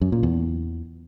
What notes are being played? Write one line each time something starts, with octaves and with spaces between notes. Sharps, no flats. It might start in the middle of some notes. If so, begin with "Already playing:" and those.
F#2
A#2
E2